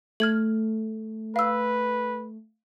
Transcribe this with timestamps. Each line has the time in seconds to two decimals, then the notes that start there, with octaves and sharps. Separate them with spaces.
0.20 A3 F6 G#6 F#7
1.36 B4 F5 E6